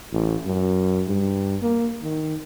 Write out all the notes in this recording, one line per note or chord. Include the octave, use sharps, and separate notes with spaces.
A1
F#2
G2
A#3
D#3